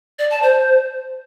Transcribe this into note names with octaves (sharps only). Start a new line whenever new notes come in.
D5
A5
C5